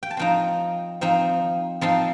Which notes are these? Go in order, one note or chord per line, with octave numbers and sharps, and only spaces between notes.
G5
A5
F3 C4 D#4 G5 A#5
F3 C4 D#4
F3 C4 D#4 A5 C6